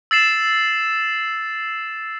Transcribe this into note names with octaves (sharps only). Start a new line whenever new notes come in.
E6 A6 C7 E7